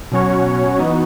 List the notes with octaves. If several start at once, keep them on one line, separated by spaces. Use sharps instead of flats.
B2 F#3 C#4 F#4 C#5
E3 B3 D#4 F#4